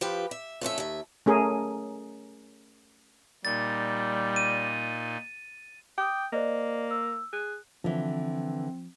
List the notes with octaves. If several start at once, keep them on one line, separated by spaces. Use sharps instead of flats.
F3 G4 B4
E5
F2 A3 C#4 E5
D#2 E5
A3 C#4 G#4 A#4
A#2 G3 D#4 A6
D#7
G5 D6 D#6
A#3 C5 D5 D#5
E6
G#4 F#6
D3 E3 F3 C4